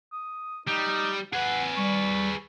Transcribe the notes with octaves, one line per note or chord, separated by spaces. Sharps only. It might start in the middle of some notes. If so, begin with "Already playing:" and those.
D#6
G3 D#4
G#4 B4 F#5
G3 C#6